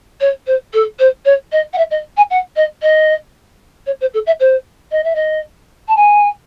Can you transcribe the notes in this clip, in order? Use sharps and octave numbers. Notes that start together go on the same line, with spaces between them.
C#5
C5
A4
C5
C#5
D#5
F#5
E5
D#5
G#5
F#5
D#5
D#5
C#5
C5
A4
E5
C5
D#5
E5
D#5
A5
G#5